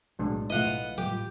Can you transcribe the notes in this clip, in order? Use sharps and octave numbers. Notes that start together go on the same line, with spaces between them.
B1 A2 F#3 G#3 D4
A3 E4 F4 B4 D#5 F#5
A2 F#3 G3 G4